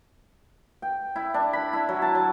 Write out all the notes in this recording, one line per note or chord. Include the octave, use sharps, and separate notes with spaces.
G5
E4
D4
B5
E4
F#3
A5
F#3